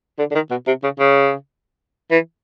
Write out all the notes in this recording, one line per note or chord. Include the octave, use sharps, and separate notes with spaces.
D3
D3
D#3
B2
C3
C#3
C#3
E3